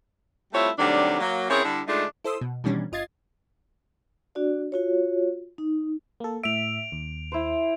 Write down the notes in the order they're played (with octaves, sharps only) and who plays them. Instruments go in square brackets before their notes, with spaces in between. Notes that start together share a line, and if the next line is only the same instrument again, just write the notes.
[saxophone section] G3 A3 C4 E4 F4 C#5
C3 D#3 F#3 G3 A3 D4
F#3 A#3
C#3 C4 E4 G#4 A#4 C#5
D3 G3 E4
D3 G#3 A3 D4 D#4 F4
[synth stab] E4 A4 C5 C6 D#6 E6
B2
B2 D#3 E3 G3 C#4 D4
G1 F4 D#5 G#6 A6 C7
[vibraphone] D4 F#4 D5
F4 F#4 C#5
D#4
[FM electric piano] A#3 A4
[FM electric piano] A2 E5 [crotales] D7 F7
[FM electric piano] D#2
[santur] E4 C5